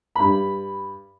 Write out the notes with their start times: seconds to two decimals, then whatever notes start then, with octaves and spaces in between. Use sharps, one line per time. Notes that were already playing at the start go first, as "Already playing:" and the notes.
0.16 G2 B5